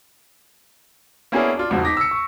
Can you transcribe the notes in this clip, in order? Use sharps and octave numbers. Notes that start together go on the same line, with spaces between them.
A#3 B3 C#4 D4 E4 G#4
D4 F4
E1 C#2 G#2 F3 F#4
D#4 D6 A#6 B6
E6 C#7
C#6